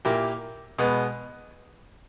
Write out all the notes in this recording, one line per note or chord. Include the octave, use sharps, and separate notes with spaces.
A#2 A#3 E4 G4
B2 G#3 B3